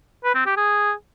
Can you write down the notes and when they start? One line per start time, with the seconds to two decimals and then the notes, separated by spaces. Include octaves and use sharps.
0.24 B4
0.35 C4
0.46 G4
0.57 G#4